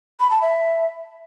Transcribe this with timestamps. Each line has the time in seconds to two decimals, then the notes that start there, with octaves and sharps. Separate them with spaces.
0.20 B5
0.31 A5
0.42 E5